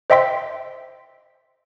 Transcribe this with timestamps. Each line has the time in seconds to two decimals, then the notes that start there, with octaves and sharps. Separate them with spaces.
0.10 C5 D#5 E5 G5 C6 B6